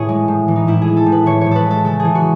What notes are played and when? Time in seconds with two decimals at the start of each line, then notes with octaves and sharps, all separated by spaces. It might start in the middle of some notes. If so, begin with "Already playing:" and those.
Already playing: A2 E3 G#4 C#5
0.09 G#3
0.28 A2
0.48 E3
0.56 D#4
0.67 A2 E4
0.82 G#4
0.88 G#3
0.97 A4
1.06 A2
1.12 B4
1.26 E3 C#5
1.41 C#5
1.46 A2
1.51 A4 B4
1.65 G#3
1.71 A4
1.85 C#3 A4
2.00 G#4
2.05 E3
2.15 F#4